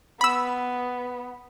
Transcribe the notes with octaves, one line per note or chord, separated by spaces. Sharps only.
B3 B5 E6